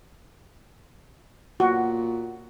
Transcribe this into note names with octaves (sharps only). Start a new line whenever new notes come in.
A#2 F#4